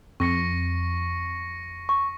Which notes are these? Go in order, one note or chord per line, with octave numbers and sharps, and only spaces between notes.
F2 C#6 A#6 C#7
C#6